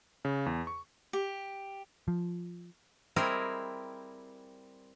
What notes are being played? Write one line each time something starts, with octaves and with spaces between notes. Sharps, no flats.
C#3
E2
C#6
G4
F3
G3 C4 E4 G#4 A#4 D#5